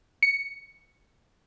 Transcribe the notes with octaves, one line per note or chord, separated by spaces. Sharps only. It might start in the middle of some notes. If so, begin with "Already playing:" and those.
C#7